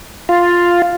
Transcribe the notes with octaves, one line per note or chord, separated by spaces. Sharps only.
F4